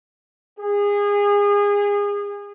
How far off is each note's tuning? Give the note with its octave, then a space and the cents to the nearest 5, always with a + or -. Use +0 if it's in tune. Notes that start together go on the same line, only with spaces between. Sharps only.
G#4 -30